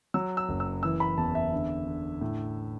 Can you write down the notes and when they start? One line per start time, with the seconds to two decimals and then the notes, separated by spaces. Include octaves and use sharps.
0.14 F#3 E6
0.37 E6
0.49 F#1
0.60 E6
0.83 E3 E6
1.00 B5
1.18 E2 A5
1.35 E5
1.53 D3
1.86 D3
2.21 A2